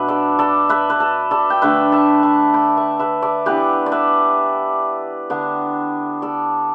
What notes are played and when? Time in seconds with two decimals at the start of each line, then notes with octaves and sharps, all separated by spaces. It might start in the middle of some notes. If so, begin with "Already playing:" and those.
Already playing: B2 B3 D4 B4 E5
0.08 A4 D5
0.39 A4 D5
0.69 B4 E5
0.90 B4
1.00 A4
1.31 A4 D5
1.50 G5
1.62 D3 A3 D4 B4 E5
1.92 E5 A5
2.23 E5 A5
2.54 G5 B5
2.77 E5 A5
2.99 B4 E5
3.22 A4 D5
3.46 E3 B3 D4 G4 B4
3.86 D5
3.92 B4 E5
5.30 D3 B3 D4
6.22 A4 D5